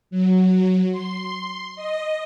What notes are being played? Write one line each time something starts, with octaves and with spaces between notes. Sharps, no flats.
F#3
C6
D#5